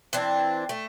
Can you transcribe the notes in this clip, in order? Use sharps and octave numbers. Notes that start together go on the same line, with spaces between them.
E3 C4 D4
A3